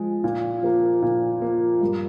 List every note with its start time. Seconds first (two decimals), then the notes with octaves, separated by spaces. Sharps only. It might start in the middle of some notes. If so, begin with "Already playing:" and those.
Already playing: F3 G#3
0.24 A#2
0.63 F3 A#3
1.02 A#2
1.41 F3 A#3
1.81 G2